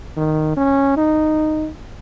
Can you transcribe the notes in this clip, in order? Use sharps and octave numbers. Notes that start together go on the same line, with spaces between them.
D#3
C#4
D#4